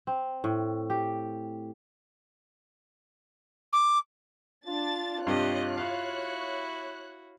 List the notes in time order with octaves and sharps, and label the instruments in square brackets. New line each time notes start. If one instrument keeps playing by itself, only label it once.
[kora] C4
A2
G4
[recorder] D6
[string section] D4 A6 [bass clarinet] F4
[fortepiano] G2 C3 [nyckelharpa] G4 D#5 [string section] C#5 F#6
[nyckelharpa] E4 F#4 [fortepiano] F5